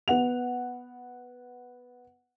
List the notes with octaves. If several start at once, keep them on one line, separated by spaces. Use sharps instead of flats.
B3 F#5 F7